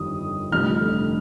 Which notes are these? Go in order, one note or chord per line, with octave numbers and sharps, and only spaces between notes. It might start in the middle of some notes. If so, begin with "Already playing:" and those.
Already playing: G1 F2 D#3 G3 D#6
F1 F2 D3 G3 F6